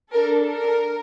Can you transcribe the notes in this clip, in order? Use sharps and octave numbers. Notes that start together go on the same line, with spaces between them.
D4 A4 A#4
A#4